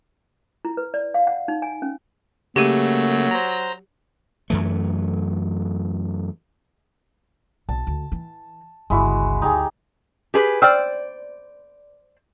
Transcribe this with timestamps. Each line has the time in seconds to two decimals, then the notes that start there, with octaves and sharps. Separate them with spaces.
0.65 E4
0.77 B4
0.94 D5
1.14 F5
1.27 F#5
1.48 D#4
1.62 G#5
1.82 C#4
2.56 C#3 F#3 A3 A#3 G4 D#7
3.31 C5 A#5
4.50 F#2 E3 A3
7.69 B1 A5
7.87 D2
8.12 E3
8.90 G1 C#2 G#3 E4 F#4
9.42 D2 D#4 G4 G#4
10.34 G4 G#4 B4
10.62 C5 D5 G5 E6 F6